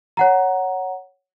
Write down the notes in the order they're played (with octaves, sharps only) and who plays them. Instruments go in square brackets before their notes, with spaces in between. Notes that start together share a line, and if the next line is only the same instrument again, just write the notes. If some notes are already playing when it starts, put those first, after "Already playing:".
[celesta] C#5 F#5 A#5